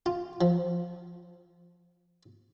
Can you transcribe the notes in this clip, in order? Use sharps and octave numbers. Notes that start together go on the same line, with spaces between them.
F4
F3